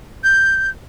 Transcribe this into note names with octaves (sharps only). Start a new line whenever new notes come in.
G6